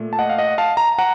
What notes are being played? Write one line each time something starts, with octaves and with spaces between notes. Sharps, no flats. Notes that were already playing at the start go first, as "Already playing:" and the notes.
Already playing: A#2 A3
A5
D#5 F#5
F5
D#5 F#5
F5 A5
A#5
F#5 A#5